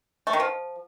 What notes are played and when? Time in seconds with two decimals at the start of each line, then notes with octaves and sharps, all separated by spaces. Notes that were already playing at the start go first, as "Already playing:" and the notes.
0.27 A3
0.33 D#3
0.40 F3